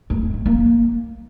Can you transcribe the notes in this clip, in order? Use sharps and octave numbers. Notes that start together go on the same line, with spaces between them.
A3
C4
A3
A#3